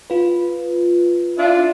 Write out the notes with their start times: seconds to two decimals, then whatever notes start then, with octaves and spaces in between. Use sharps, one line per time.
0.10 F4 B4
1.37 D4 E4 F4